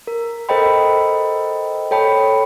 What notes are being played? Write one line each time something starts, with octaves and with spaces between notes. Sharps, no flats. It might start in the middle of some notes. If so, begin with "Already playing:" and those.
A#4
A4 A#4 C5 D#5 G5 B5
A4 C#5 G5 A5 B5